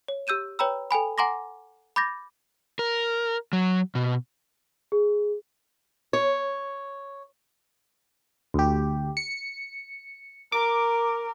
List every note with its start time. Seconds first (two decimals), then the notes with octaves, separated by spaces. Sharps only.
0.08 C#5
0.27 G4 E6 G6 D#7 E7
0.59 B4 C#5 G5 A#5 B5 E6
0.91 A4 G5 G#5 B5
1.18 F#5 G#5 A#5 C6 D6 A#6
1.96 B5 D6 G6 A6 A#6
2.79 A#4
3.53 F#3
3.95 B2
4.92 G#4
6.13 C#5
8.54 D2 G4
9.17 C#7
10.52 A#4 D6